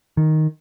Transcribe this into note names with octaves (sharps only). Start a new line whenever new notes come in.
D#3